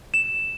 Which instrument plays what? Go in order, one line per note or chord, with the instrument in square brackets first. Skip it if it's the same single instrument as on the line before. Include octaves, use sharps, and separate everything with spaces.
[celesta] E7